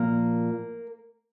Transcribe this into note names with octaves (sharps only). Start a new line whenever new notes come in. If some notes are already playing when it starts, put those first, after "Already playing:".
Already playing: A#2 F3 A#3 A#4